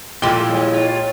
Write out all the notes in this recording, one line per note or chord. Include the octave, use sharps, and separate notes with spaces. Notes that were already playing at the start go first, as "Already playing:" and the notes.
A#2 F3 G#3 A3 E4 G5 G7
G3 C#5
F4